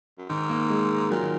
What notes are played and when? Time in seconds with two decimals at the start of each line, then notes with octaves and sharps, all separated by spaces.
0.18 F#2
0.29 G#2 D#3
0.50 A#3
0.70 G#3
1.10 A#2 F#3
1.22 D#3